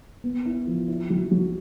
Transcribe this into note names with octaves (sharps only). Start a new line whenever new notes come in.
B3
E4
F3
E4
F#3
F#3